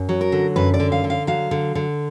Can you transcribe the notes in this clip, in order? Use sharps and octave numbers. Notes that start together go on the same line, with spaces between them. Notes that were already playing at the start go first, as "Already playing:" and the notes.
Already playing: F#2
F#3
A#4
D3
F#2 B4
D5
D3
F5
D3
F5
F#3 F5
D3
D3